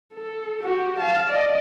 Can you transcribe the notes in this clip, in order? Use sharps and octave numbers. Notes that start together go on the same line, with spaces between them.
A4
F#4 G4
F5 A5
D5 D#5